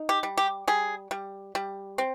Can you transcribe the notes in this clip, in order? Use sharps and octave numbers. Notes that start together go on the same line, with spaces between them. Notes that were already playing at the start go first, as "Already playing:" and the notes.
Already playing: D#4
G4
G3
G4
G3 G#4
G3
G3
C4